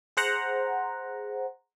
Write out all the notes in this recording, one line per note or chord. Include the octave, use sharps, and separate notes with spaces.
G#4 C5 F#5 A#5